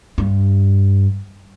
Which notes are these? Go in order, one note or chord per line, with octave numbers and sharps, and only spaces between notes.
G2